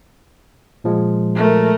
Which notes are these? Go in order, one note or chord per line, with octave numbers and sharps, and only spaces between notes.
A#2 F3 G#3
A3 A#4